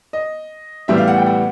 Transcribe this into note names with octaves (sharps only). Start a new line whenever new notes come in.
D#5
A2 E3 G3 B3 E5
F5
F#5
G5
F#5